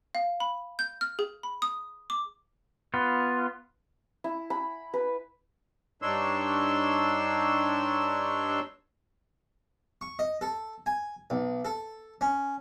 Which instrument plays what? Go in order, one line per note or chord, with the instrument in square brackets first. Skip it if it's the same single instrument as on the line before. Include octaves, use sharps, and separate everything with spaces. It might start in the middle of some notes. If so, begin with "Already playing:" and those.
[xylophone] F5
B5
G6
F6
G#4
B5
D#6
D6
[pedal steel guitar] B3 F4
[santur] E4
B5
B4
[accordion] G2 D4 D#4 C#5 C6 E6
[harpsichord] C#6
D#5
A4
G#5
B1
A4
C#4